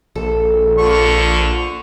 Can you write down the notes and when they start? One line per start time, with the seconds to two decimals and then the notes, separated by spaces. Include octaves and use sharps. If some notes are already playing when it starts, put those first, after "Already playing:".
0.15 A#1 A4
0.78 D3 F3 C#6